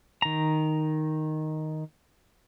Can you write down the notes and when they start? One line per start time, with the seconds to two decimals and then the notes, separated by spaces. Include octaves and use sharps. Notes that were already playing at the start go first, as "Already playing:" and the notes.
0.22 D#3 A#5